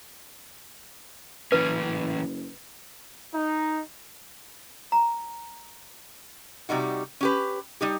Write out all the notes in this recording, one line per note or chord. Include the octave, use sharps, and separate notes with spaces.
F#1 E3 C#4 B4
D#4
A#5
C3 G3 D#4 F#4
C#4 G4 B4
G3 D#4 G4